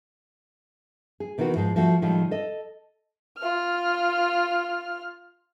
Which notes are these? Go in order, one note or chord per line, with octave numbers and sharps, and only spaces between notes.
G#4
C3 D#3 E3 B3 F#4
G#2 F3 G#3
F3 A3 F#4
A2 D#3 F3 G3 G#3
A4 D#5
F4 F6